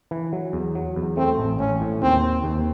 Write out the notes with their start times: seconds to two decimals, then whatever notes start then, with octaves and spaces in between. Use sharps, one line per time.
0.11 E3
0.33 F#3
0.53 E2
0.75 F#3
0.96 E2
1.17 A3 C4
1.38 A1
1.59 A1 C#4
1.81 A2
2.02 D#2 C4
2.23 C4
2.44 D#2